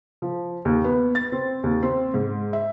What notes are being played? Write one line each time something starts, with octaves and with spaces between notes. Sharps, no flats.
F3
D#2
B3
A6
C4
D#2
C4
G#2
E5